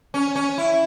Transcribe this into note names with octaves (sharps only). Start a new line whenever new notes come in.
C#4
C#4
E4